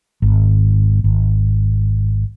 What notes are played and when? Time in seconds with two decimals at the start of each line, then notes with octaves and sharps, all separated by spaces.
0.22 G#1
1.04 G#1